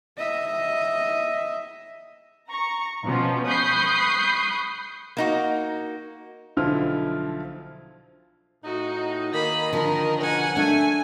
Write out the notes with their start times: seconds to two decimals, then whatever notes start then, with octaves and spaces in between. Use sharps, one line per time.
0.17 D#5 E5
2.50 A#5 C#6
3.05 B2 F3 B3 C#4
3.46 B5 C#6 D#6 F#6 G6 C7
5.17 A#3 D#4 F#4
6.57 B1 D3 F3 E4 F4 F6
8.65 A2 D#4 F#4
9.32 D#3 A#3 D#5 B5
9.73 D3 F3 A#4
10.21 G#2 B2 C#4 F#5 G#5
10.57 A3 D4 G#5